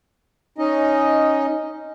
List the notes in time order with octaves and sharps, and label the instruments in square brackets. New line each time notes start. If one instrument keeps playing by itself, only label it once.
[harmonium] C#4 D#4 D#5